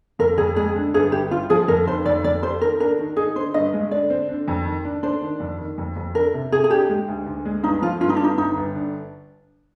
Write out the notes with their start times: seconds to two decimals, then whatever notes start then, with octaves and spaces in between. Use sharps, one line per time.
0.19 F2 A#4
0.38 F2 G#4
0.56 G#3 G#4
0.75 D3
0.94 G1 G#4
1.12 G1 G4
1.31 G1 F4
1.50 F3 G#4
1.68 F2 A#4
1.87 F1 C5
2.06 F2 D5
2.24 F2 D5
2.43 G4 C5
2.61 D#3 A#4
2.80 D4 A#4
2.99 D#3
3.17 D#4 G#4
3.36 D3 C5
3.54 G2 D#5
3.73 G#3
3.91 D3 D5
4.10 C4
4.29 D3
4.48 F2
4.66 D#3
4.85 D4
5.03 D4 C5
5.22 D#3
5.40 F2
5.59 D#3
5.78 F2
5.96 F2
6.15 D4 A#4
6.34 C3
6.52 C3 G#4
6.64 G#4
6.71 D4 G4
6.89 G#3
7.08 D2
7.26 D2
7.45 G#3
7.63 G2 D#4
7.82 F3 F4
8.01 G2 F4
8.09 D#4
8.17 D4
8.20 G2 D#4
8.38 G1 D#4
8.57 G1
8.75 D3